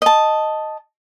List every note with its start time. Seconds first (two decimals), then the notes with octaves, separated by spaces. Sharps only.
0.02 D#5 A5